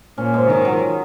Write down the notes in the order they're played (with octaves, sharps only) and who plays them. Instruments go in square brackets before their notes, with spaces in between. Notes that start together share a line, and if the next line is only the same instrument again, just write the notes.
[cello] A#2 [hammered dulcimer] C#4
[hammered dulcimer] G#2
[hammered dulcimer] G#2 [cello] D#3
[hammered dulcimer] F#3